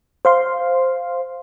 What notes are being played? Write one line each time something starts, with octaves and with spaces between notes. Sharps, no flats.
C5 F5 C6